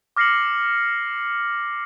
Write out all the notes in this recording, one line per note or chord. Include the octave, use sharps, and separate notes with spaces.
D6 F6 A#6 C7 C#7 F#7